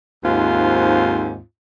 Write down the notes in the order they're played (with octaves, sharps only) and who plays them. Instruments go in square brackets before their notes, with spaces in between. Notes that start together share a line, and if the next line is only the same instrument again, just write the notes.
[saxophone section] D#2 G#2 C4 F4